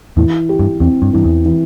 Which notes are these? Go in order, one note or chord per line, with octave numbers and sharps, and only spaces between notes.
E2 A2 E3
G4
G2
E2 C4
G2
G2 E3
E2
E3